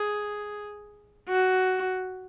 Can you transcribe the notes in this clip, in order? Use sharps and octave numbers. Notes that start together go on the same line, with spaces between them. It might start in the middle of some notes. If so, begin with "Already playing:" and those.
Already playing: G#4
F#4